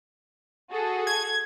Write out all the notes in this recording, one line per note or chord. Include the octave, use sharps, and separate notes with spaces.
F#4 G#4 A4
G#6